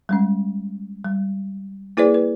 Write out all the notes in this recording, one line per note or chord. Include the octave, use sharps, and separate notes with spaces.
G3 G#3 C#4
G3
A#3 E4 G#4 B4 C5 D5
B4